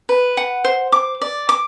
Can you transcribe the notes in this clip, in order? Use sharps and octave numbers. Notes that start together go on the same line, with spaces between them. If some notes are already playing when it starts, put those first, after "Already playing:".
B4
F#5
C5
D6
D5
D6